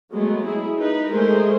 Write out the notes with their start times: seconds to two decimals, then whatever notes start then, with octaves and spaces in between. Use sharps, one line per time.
0.11 F#3 G#3 A3 B3
0.46 E4 G#4
0.77 D#4 B4
1.11 G#3 A3 G#4 A#4 C5